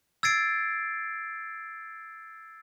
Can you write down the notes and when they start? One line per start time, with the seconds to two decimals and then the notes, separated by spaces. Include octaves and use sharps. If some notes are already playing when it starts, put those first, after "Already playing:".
0.23 E6 G#6 A6 C7 D7